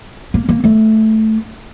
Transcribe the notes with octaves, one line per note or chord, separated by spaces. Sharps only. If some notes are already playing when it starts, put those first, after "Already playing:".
A#3
A#3
A3